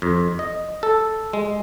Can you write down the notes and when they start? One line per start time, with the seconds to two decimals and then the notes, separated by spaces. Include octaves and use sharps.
0.02 F2
0.39 D#5
0.83 A4
1.33 G#3